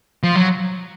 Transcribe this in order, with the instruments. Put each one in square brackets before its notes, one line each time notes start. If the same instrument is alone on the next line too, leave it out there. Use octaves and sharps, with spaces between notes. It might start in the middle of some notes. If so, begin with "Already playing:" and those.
[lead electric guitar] F3
F#3